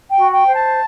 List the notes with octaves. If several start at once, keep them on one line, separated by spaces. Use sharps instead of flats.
G5
F#4
G5
C5
A5